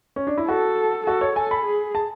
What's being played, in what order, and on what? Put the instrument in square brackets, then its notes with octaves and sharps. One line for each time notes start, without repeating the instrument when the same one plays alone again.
[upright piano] C#4
D4
E4
[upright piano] F#4 [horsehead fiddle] A4
[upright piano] F#4 [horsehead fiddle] A4
[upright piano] C#5
[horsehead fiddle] A4 [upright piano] G#5
[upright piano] B5
[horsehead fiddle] G#4
[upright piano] A5